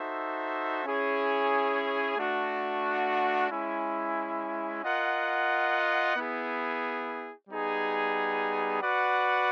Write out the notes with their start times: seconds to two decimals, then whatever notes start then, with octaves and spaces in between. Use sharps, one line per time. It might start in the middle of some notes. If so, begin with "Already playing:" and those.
Already playing: D#4 F#4 A4 C5 E5
0.85 C#4 E4 G#4 C#5
2.17 A3 D4 F#4
3.50 G#3 C#4 E4
4.83 F4 A#4 D#5 F#5
6.17 B3 E4 G#4
7.49 G3 B3 D#4 G#4
8.82 F#4 B4 D5 F#5